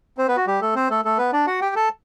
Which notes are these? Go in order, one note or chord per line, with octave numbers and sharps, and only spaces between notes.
C4 C5
B3 B4
F#4
G3 G4
A3 A4
C4 C5
A3 A4
A3 A4
B3 B4
D4 D5
F#4 F#5
G4 G5
A4 A5